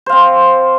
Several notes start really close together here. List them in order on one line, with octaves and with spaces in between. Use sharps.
C5 F5 C4